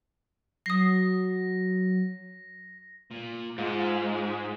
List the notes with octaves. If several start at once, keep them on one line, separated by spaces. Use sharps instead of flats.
F#3 D#6 A#6 C7
A#2
G#2 G#3 F4